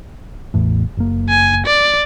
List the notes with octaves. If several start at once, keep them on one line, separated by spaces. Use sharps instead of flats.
A1 E2 A2
F#1 A#3
G#5
D5